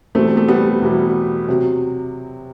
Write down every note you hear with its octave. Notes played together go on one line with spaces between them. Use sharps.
E2 B2 G3 A3 C4
A3
G3 B3
E2 B2 G3
C3 F#3